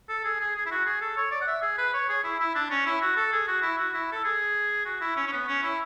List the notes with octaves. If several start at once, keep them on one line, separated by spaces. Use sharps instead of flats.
A4
G#4
G#4
G#4
E4
F#4
G#4
A4
C#5
D5
F#5
E5
G#4
B4
C#5
G#4
E4
E4
D4
C#4
E4
F#4
A4
G#4
F#4
E4
F#4
E4
A4
G#4
F#4
E4
C#4
C#4
B3
C#4
E4